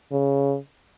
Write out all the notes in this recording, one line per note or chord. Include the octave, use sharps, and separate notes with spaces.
C#3